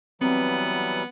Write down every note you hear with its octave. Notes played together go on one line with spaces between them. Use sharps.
E3 F#3 G3 B3 C4